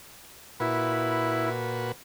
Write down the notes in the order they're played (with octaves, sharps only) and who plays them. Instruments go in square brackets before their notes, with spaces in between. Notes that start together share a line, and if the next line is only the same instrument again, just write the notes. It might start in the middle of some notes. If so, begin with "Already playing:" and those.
[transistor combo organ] A#2 F#4 B4 [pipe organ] E4